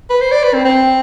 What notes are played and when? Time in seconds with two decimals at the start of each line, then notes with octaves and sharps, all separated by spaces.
0.10 B4
0.21 C5
0.32 D5
0.43 B4
0.54 C4
0.65 C4